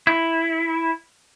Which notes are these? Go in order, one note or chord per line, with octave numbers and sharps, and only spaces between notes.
E4